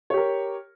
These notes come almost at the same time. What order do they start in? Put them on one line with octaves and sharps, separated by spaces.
C#5 G4 A#4